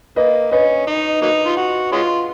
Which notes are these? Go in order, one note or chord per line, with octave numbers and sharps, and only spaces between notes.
A#3 B4 D#5
C#4 B4 D#5
D#4
F#3 A#3 D#4
F4
F#4
G#3 C#4 F4